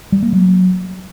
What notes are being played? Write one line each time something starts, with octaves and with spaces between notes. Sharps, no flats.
G3
A#3
F#3